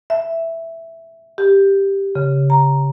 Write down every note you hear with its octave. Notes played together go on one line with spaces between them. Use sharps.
E5
G4
C#3
A#5